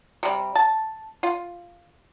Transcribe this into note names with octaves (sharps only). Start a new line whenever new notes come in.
C3 G3
A5
F4